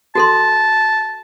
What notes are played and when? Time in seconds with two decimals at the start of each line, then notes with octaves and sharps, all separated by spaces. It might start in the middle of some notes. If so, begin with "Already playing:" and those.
0.15 F#4 A4 A5 C6